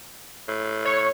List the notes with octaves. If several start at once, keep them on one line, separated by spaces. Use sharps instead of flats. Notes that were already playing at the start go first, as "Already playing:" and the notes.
A2
C#5